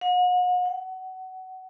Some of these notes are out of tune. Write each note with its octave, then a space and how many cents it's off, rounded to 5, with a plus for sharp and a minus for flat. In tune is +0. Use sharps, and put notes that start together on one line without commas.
F#5 -40
F#5 +20